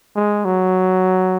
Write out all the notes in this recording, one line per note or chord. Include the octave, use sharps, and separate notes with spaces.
G#3
F#3